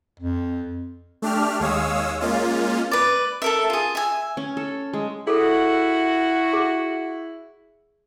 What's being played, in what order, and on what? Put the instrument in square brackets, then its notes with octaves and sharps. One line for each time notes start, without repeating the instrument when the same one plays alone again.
[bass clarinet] F2
[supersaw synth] A3 D4 G4 F6
D#2 G#3 C#5 F5 D#6 E6
G#3 A#3 C#4 F4
[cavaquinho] B4 D5
A4 A#4 E5
F4 G#4
E5 G#5
[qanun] C#4
A4
G#3
[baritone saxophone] E4 [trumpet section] F#4 [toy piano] G#4 A4
[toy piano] G#4